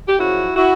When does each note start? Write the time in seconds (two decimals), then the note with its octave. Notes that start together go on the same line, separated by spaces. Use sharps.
0.08 G4
0.18 F#2 C#3 F3 E4 F#4
0.56 E4 F#4